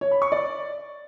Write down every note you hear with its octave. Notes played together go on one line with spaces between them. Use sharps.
C#5
B5
C#6
D5